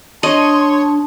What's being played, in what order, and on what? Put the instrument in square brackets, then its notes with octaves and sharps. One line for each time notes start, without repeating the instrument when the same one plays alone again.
[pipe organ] D4 [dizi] C#5 [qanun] D#5 [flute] C6